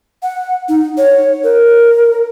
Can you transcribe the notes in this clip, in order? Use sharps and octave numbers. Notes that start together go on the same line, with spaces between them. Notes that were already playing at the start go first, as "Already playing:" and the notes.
F#5
D#4
C#5
A#4